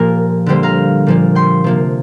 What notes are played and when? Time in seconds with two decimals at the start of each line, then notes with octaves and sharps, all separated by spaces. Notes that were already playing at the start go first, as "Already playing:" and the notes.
Already playing: A#2 F3 A#3 G4 A#4
0.46 D3 G3 A#3 G4 C5
0.63 F5 A#5
1.07 A#2 F3 A#3
1.35 G5 C6
1.64 C3 F3 A#3